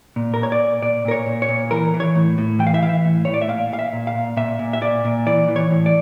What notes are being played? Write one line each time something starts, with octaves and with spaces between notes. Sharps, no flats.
A#2
A#2 A#4
C#5
D5
A#2
A#2 D5
A#2 A#4
C#5
A#2
C#5
A#2
E3 A#4
E3
C#5
A2
A2
E3 G5
F5
E5
E3 F5
E5
A2
A2 C#5
D5
E5
A#2 F5
A#2 F5
E5
A#2
F5
A#2
A#2 E5
A#2
E5
A#2 D5
A#2
E3 D5
E3
C#5
A2
D5